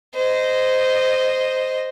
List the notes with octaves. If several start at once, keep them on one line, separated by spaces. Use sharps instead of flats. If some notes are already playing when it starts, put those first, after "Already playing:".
C5 D#5